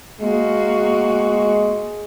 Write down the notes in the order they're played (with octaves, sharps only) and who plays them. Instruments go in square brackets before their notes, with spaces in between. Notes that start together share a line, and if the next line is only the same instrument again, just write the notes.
[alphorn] G#3 [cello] A#3 F#4